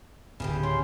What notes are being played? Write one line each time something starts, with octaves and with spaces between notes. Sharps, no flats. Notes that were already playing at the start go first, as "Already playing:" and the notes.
D1 C#3 E3 G4
C#4 C6